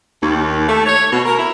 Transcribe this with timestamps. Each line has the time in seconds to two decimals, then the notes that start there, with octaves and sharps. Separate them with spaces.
0.21 D#2
0.67 A3
0.86 C#5
1.11 B2
1.25 A#4
1.39 E4